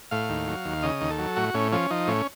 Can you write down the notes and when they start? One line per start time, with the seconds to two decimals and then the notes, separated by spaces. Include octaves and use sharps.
0.11 A2 F5
0.30 D#2
0.48 F#3
0.65 D#2
0.83 C#3 D#5
1.01 D#2
1.10 A4
1.19 F#3
1.36 A2 F#4
1.54 A2 C#4
1.72 F3 C#4
1.90 F3 D#4
2.07 A2 C#4